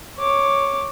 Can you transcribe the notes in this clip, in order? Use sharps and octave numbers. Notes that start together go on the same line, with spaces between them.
C#5 D6